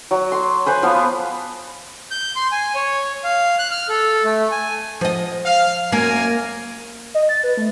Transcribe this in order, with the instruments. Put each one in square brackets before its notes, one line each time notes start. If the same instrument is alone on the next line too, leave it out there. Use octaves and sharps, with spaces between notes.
[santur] F#3
C6
B4 C5 G#5 D6
F3 B3 B4 F5
[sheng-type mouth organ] G6
C6
G#5
C#5
F5
F#6
F6
A4
A3
G#5
[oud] F3 D#5
[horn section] F5
[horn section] F#2 A#4 G#5 [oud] A#3
[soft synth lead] D#5
A6
B4
A3